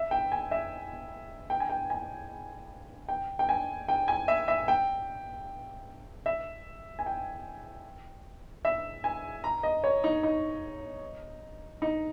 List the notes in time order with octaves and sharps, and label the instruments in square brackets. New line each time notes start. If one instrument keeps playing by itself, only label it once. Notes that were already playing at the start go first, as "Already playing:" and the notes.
Already playing: [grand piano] E5
G5
G#5
E5
G5
G#5
G5
G#5
G5
G5
G#5
G5
G#5
E5
E5
G5
E5
G#5
G5
E5
G#5
A#5
D#5
C#5
D#4
D#4
D#4